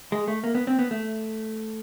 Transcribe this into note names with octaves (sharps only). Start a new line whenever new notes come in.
G#3
A3
A#3
B3
C4
B3
A3